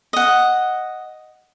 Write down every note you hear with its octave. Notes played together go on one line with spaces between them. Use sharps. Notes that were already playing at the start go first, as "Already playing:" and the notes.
D#5 F#5